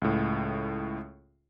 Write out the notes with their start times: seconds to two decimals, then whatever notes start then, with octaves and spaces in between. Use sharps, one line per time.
0.02 C#2 A2